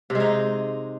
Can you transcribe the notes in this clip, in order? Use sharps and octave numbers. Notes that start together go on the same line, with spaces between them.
C3
G#3
D#4